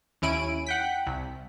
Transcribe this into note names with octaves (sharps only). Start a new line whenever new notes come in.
D#2 C#4 E4 D7 D#7
F#5 G5 B6
C2